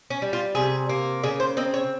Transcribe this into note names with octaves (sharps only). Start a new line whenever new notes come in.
C#4
G3
F4
C3 G#4
A#3
C#3 G#4
C5
C4 D#5
C#5